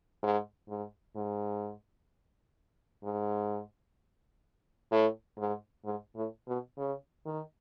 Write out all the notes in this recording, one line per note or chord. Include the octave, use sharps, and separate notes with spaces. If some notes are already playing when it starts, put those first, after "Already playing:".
G#2
G#2
G#2
G#2
A2
G#2
G#2
A2
B2
C#3
D#3